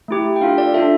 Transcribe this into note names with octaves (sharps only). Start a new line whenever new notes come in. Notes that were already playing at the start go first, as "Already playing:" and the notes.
A3 E4 G4
G5
D4 F4 A4 F5
D5
D4 F4 A4 E5